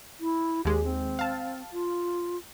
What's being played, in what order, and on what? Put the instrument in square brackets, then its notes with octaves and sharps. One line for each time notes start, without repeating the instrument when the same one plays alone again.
[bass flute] E4
[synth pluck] D#2 G#3 [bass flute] G4
[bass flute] C4
[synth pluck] F5 A5
[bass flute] F4